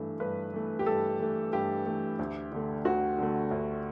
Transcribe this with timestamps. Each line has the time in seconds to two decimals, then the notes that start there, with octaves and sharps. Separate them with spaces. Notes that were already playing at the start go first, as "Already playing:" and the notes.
Already playing: G2 E3 A3
0.20 G2 B4
0.53 E3 A3
0.79 G4
0.86 G2 A4
1.20 E3 A3
1.53 G2 G4
1.86 E3 A3
2.19 D2
2.52 D3 A3
2.85 D2 F#4
3.18 D3 A3
3.51 D2